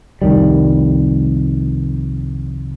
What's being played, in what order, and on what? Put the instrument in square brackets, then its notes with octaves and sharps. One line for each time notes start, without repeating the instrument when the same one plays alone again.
[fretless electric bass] C2 F2 D#3 G3